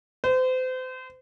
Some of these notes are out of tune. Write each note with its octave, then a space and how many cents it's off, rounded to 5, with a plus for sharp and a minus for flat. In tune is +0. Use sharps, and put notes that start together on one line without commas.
C5 -35